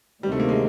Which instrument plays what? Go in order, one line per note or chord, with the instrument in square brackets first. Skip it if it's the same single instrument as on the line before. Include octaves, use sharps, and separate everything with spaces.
[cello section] D2 C3 D#3 [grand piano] G3
[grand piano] A3
A#3
G#3